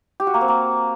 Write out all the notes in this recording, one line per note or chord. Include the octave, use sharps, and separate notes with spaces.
G4
F#4
A#3
C4
A#3